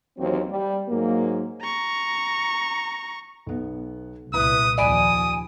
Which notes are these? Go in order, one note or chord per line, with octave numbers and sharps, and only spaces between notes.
D#2 E3 F#3 C4
G3
G#2 F#3 A#3
A#5 C#6
B1 B3
C2 A#2 E4 B4 D#6
D#2 F3 D5 G#5 B5 D#6 D7